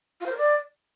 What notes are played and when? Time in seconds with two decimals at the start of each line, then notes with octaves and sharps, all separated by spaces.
0.20 F4
0.26 C5
0.32 A#4
0.37 D5